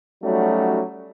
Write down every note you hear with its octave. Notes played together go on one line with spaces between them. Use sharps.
F#3 G3 A3 C#4 D#4 F#4